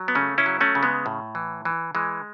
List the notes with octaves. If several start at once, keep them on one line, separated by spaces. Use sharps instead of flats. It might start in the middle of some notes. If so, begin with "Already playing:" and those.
Already playing: F#3
B3
C#3 A3 C#4
C#4 E4
F#3
A3 C#4
C#3
G#3 B3
A2
E3
E3
E3 G#3